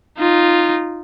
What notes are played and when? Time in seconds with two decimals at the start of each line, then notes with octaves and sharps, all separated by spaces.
0.18 D#4 F4